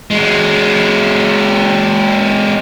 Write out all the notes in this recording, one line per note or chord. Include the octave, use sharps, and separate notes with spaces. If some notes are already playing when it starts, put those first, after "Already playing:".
F#3 G#3